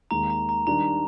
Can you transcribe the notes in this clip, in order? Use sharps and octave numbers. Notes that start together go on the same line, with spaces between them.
D#2 D#3 G#3 A#5
A#5
A#5
D#3 G3 D4 A#5